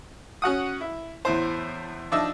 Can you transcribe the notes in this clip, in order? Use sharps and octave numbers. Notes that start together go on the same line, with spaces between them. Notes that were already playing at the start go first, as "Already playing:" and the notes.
C#4 F#4 F#5 D#6
E4
E2 A2 C5
F3 D4 D#4 E5